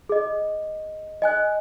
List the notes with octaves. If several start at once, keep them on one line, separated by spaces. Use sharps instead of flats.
G#4 D#5
D#5 G#5 F#6